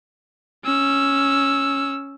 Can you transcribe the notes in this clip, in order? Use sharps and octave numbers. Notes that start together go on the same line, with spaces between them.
C#4 E6